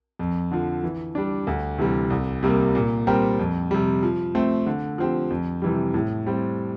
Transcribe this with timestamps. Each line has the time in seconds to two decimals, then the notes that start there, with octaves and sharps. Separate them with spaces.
0.19 F2
0.51 D3 F3
0.83 E3
1.15 G3 D4
1.47 D2
1.78 C3 E3 G3
2.10 C2
2.43 C3 G3 A#3
2.75 A#2
3.07 G3 C4 G4 A#4
3.39 F2
3.71 C3 G3
4.03 F3
4.35 A3 C4
4.66 D3
4.98 F3 C4 G4
5.30 F2
5.62 C3 E3 G3
5.94 A2
6.26 G3 C4